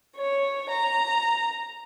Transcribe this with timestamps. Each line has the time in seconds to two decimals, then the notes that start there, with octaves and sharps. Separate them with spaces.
0.17 C#5
0.69 A#5